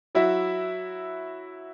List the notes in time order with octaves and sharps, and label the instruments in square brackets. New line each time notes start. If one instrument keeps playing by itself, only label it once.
[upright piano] F#3 E4 F#4 E5